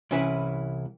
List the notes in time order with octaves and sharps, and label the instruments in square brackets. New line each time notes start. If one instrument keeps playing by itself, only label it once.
[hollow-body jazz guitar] C2 E3 C#4 E4 B4